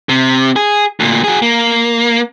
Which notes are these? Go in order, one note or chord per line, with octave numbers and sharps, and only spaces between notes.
C3
G#4
D2 A#2
F#4 G#4
A#3